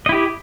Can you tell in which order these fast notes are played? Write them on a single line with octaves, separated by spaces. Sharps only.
D#5 E4 G4